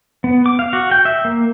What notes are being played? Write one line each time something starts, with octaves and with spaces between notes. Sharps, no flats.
B3
D6
F5
F#4
G5
E5
A#3